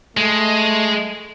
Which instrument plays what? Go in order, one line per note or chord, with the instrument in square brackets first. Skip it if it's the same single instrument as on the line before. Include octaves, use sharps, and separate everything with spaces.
[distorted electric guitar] G#3 [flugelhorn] A3